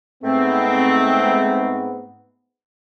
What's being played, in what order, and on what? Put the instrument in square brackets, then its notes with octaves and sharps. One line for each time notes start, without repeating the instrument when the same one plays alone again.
[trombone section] G#2 B3 [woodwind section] A3 C4